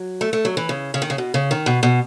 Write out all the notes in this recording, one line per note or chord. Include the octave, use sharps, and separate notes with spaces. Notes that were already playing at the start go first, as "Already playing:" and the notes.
Already playing: F#3
A3
A3
F#3
E3
C#3
C#3
D#3
C#3
B2
C#3
D#3
B2
B2